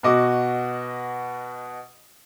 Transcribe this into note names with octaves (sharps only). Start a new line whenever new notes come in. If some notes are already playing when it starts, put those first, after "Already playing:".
B2 F#4 D#5 D6